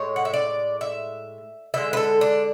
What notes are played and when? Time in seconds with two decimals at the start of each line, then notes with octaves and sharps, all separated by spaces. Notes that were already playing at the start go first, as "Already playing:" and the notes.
Already playing: A2 G#3 C#5
0.16 F#5
0.25 E5
0.34 D5
0.81 E5
1.74 D3 G#3 E5
1.93 B4
1.97 A4
2.21 D4